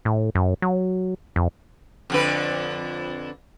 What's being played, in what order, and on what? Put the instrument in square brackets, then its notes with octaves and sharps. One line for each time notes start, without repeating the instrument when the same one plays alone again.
[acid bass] A2
F#2
F#3
F2
[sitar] F2 D3 B4